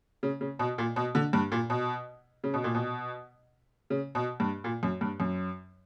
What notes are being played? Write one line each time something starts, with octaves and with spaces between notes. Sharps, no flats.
C#3
C#3
B2
A#2
B2
D3
G2
A#2
B2
C#3
B2
A#2
B2
C#3
B2
G2
A#2
F#2
G2
F#2